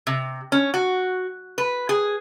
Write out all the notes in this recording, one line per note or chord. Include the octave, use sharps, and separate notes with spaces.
C3
C#4
F#4
B4
G#4